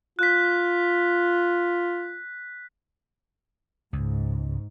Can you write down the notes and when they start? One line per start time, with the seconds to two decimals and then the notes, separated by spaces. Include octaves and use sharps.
0.19 F4 F#6 B6
3.93 C#2 G#2